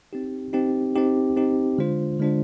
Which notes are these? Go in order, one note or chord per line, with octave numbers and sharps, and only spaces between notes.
C4 D#4 G4
C4 D#4 G4
C4 D#4 G4
C4 D#4 G4
D3 G#3 D4 F4 C5
D3 G#3 D4 F4 C5